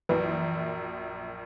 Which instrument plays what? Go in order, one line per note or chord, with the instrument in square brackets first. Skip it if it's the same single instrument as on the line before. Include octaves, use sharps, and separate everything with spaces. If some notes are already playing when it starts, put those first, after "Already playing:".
[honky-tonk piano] A#1 F#2 [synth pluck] E3